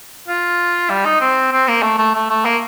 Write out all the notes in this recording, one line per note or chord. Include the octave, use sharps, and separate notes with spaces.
F4
G3
D#4
C4
C4
A#3
A3
A3
A3
A3
A#3